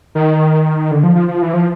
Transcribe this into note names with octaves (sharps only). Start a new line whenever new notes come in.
D#3
D3
F3
F3
F3
E3
F3